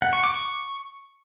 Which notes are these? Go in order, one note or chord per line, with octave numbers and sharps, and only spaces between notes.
F#5
C#6
D6
C#6